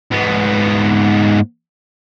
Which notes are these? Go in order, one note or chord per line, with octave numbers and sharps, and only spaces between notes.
G#2 B3